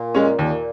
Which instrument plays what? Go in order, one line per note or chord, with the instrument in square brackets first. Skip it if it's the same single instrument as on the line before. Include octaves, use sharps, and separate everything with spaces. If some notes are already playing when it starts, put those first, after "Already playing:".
Already playing: [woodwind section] A#2
[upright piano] G#3 C#4
[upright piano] D#2 [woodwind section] A#2